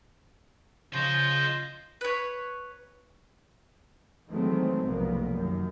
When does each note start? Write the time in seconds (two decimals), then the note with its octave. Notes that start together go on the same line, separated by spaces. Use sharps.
0.94 C#3 F4 C5 D#5 G6
2.01 B4 C#5
4.29 D#3 E3 F#3 G#3 A3 C4
4.84 F1 B1 A#3 B3
5.31 F#2 D#3